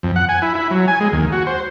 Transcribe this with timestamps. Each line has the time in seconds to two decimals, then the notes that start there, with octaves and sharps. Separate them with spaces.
0.03 F2
0.16 F#5
0.29 G#5
0.42 E4
0.55 E4
0.71 F#3
0.88 G#5
1.00 G#3
1.12 D#2
1.32 F#4
1.47 C5